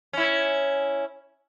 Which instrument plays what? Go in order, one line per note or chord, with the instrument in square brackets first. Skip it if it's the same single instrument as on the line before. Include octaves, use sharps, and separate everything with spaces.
[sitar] C#4 E4